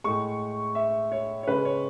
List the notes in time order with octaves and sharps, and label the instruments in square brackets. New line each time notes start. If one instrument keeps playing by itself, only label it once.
[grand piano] A2 G#3 C#6
E5
C#5
C#5
C#3 G#3 B4
C#5